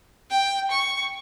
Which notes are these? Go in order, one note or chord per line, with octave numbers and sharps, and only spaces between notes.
G5
C#6